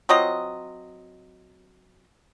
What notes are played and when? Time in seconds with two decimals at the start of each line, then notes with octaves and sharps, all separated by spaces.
0.09 F#3 C4 F4 D#5